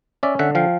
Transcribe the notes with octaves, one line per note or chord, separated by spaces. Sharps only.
C#4 D5 E5
D3 E5 F#5
F3 F5 G5